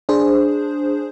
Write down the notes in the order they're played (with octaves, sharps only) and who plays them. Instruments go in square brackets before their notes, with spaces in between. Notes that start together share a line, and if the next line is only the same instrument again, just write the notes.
[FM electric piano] D4 G#4 C5